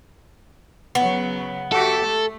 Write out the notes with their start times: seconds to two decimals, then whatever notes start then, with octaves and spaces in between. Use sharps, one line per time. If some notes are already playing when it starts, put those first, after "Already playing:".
0.95 C#3 F#3 B3
1.72 F#4 G4 A4 E5
2.03 A3